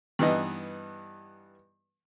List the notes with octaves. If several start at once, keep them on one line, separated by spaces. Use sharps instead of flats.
G2 E3 B3 D#4 D#5